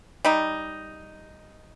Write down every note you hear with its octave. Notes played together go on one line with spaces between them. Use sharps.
G3 D#4